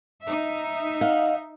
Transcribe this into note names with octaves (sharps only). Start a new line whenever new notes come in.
D#4 E5
D#5 F5 F#5